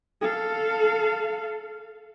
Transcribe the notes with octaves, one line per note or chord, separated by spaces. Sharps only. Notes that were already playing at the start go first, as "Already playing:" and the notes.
A4 F5